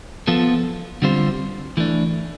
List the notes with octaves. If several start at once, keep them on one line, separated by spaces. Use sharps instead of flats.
F3 B3 F4 A4
D3 G3 C4 F4 C5
E3 A3 D4